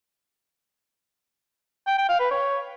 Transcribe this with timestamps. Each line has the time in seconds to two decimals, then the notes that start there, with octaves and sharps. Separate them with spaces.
1.87 G5
1.98 G5
2.09 F5
2.20 B4
2.31 C#5